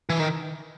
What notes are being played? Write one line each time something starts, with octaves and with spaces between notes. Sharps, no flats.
E3
D#3